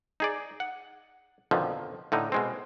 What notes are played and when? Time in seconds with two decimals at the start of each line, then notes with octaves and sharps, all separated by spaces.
0.20 D#4 G#4 D5
0.60 F#5
1.51 F2 B2 D3 D#3 F3
2.12 A2 D3 D#4
2.32 B2 G#3 C4